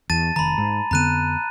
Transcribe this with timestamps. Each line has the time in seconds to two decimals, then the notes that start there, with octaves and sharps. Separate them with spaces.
0.10 E2 A5 A6 D#7
0.36 F1 D#3 A#5 B5
0.58 G#2
0.91 F2 D3 B3 A#5 F#6 D#7